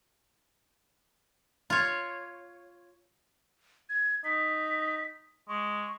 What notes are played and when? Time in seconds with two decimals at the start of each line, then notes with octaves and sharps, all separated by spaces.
1.70 F4 C#5
3.89 G#6
4.25 D#4 B6
5.49 G#3 C#6